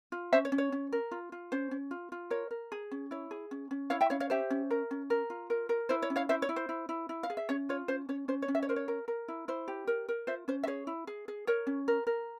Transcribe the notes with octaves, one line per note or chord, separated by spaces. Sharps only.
F4
C#4 C5 E5
C#5
C#4
C#5
C#4
A#4
F4
F4
C#4 C5
C#4
F4
F4
A#4 C#5
A#4
G#4
C#4
E4 C#5
G#4
C#4
C#4
E4 C#5 F5
E5 G5
C#4 C#5 F5
C#5 F5
G4 C5 E5
C#4
A#4
C#4
A#4
F4
A#4
A#4
E4 C5
C#5
C#4
C#5 F5
E4 C5 E5
C#5
E4
C5
E4
E4
E4
F5
G#4
E5
C#4 C#5
F4 C#5
C#4 C5
C#4 C#5
C#4 C5
C#5
C#4
E5
C#5
A#4 C5
C#5
A#4
A#4
E4
E4 C5
G4
A#4
A#4
F4 C5 E5
C#4 C5
E5
G#4 C#5
E4
G#4
G#4
A#4 C#5
C#4
A#4
A#4